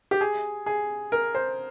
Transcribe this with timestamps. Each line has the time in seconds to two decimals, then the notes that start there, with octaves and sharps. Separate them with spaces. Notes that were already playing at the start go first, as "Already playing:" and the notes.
0.11 G4
0.21 G#4
0.66 G#4
1.12 A#4
1.35 C5